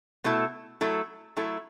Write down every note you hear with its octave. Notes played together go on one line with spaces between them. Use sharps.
B2 A3 E4 A4
F#3 A3 E4 A4
F#3 A3 E4 A4